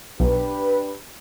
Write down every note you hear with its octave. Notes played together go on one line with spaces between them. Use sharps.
B1 D4 G4 B4